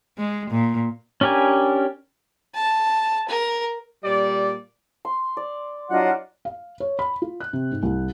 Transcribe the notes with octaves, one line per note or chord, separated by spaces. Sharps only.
G#3
A#2
C#4 D4 G4 A#4 G#5
A5
A#4
A#2 G3 D5
C6
D5
F#3 D4 E4 F4 C#5 D#5 F#5
F5
C#5
B5
F4
F#6
C3
G#2
C2